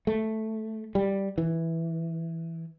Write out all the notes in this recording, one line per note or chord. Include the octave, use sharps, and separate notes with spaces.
A3
G3
E3